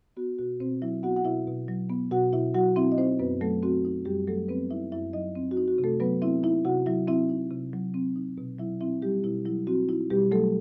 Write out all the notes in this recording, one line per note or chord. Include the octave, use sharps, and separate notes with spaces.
B3 F#4
B2 F#4
B2 C4 C5
F#3 E4 E5
B3 F#4 F#5
F#5
B2 E4 E5
B2
F#3
B3
B2 F#4 F#5
B2 E4 E5
F#3 F#4 F#5
C4 E4 E5
D#5
C4 D#4 C5
F#2 B3 B4
F#3 A3 A4
C4 F#4
D#4
F#2 G3 G4
F#3 A3 A4
B3 C4 B4
D#4 E4 E5
F#2 E4 E5
F#3 D#4 D#5
C4
F#4
D#4
F#4
C3
A3 A4
F#3 B3 B4
C4 E4 E5
D#4 E4 E5
C3 F#4 F#5
F#3 E4 E5
C4 E4 E5
D#4
C3
F#3
C4
D#4
B2
F#3 E4 E5
C4 E4 E5
G3 D#4 G4
B2 E4
F#3 E4
C4 F#4
D#4 E4
B2 G3 G4
F#3 A3 A4